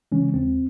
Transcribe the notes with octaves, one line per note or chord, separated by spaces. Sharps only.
C#3 E3 G#3 C#4
D#2 C4